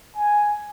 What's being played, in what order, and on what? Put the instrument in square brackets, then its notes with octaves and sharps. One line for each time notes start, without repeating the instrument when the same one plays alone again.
[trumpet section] G#5